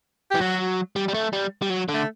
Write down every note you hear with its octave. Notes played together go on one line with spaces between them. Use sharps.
E3 G4
F#3 F#4
G3
G3
A3
G3
G3
F#3
D3
A3